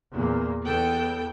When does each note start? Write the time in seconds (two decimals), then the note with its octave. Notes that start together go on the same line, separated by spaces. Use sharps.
0.14 E2 A#2 A#3
0.63 E2 B3 A4 G5